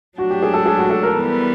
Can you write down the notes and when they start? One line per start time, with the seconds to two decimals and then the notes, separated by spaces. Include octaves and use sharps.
0.18 F#3 A3 D4 F#4
0.30 G4
0.43 G#4
0.54 A4
0.66 G#4
0.79 F#4
0.90 A4
1.03 A#4
1.15 E3 G3 B3